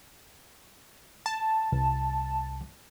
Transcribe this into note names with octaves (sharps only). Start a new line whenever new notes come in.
A5
C2